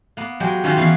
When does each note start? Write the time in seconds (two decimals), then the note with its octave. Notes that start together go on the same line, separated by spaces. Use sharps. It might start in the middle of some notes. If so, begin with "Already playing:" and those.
0.17 A#3 B3
0.40 F#3 G#3 G4
0.64 D#3 C#4 F4 F#4
0.77 E3 B3 F5